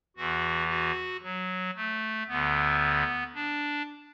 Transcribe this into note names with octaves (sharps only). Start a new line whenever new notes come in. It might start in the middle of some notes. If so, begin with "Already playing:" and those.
E2 E3 F#4
F#4
F#3
A3
D2 D3 B3
D4